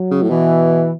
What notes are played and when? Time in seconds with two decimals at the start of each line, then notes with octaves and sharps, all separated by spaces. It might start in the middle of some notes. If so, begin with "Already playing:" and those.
Already playing: F#3
0.11 C#3
0.23 A2
0.30 B2 E3